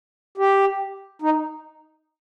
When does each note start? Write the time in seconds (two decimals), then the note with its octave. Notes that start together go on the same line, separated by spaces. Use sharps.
0.38 G4
1.22 D#4